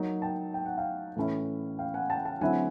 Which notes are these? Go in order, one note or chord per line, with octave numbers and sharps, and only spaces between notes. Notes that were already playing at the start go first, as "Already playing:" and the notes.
Already playing: F#3 A#3 D#4
G5 A5
G5
F#5
F5 G5
A2 E3 A3 C#4 E4
F5 G5
F#5 G#5
G5 A5
G5 A5
D3 F#3 A3 C4 E4 F#5 G#5